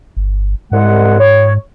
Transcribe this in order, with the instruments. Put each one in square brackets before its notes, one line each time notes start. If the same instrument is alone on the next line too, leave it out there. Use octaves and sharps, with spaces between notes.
[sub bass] G1
[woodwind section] C2 G#3 F#5 [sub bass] G#2
[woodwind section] C#5